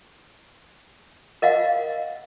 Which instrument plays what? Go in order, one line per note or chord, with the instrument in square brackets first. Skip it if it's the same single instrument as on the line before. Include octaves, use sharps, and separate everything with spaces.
[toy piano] A#4 D#5 F5 F#5